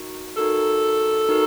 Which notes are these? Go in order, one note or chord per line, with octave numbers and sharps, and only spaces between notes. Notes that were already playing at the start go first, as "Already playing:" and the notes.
Already playing: D#4 F#4 A#4
D#4 F#4 A4 A#4
D#4 F#4 A#4